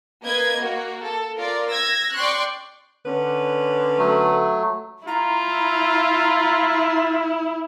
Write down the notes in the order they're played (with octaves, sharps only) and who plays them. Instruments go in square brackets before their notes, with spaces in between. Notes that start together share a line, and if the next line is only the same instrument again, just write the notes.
[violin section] A#3 B4 D#5 G#6
A#3 F#4
A4
F4 A#4 D5
E6 G#6 A#6
D5 G5 C6 C#6 F#6
[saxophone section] D3 C#4 B4
[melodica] F#3 A3
[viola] E4 [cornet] F4 [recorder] A#5